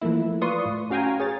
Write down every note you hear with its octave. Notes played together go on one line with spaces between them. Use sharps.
E3 F3 A3 A#3 E4
F4 B4 D5 C6 C#6 D#6
A2
C#4 F#4 F5 G5 G#5 A#5
G#4 C#5 A6